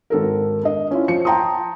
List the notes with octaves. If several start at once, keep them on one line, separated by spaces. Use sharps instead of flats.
G#1 A4 A#4
D4 D#5
C#4 E4 F4
F3 C#7
G5 A5 A#5 C6 D#6